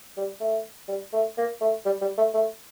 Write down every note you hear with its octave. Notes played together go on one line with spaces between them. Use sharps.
G3
A3
G3
A3
A#3
A3
G3
G3
A3
A3